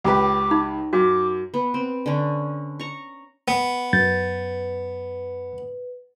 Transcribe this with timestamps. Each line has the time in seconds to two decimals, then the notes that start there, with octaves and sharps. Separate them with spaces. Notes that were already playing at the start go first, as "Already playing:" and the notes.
0.04 C#2 G4 B4 D6
0.51 D#4
0.93 F#2 F#4 D6
1.54 B3
1.74 C4
2.06 D3 C#4
2.80 A#5 C#6
3.48 B3
3.93 F#2 B4 G6 A6